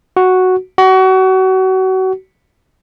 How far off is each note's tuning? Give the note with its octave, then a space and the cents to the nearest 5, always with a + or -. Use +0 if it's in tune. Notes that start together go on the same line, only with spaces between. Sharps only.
F#4 +0
F#4 +30